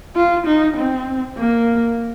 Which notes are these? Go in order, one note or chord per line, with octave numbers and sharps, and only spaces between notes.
F4
D#4
C4
A#3